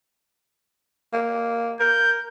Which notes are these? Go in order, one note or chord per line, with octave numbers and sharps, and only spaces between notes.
A#3
A#4 G6